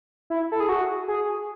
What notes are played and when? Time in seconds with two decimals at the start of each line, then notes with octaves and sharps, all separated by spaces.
0.30 E4
0.52 A4
0.60 G#4
0.69 F#4
1.08 G#4